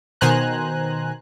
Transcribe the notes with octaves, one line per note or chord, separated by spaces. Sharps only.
B2 D#3 C5 G#5 A#5 F#6